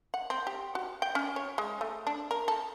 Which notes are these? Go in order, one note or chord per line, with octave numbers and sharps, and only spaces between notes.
F#5
C4
G4
F#4
G5
C#4
C#5
G#3
A3
D4
A#4
A4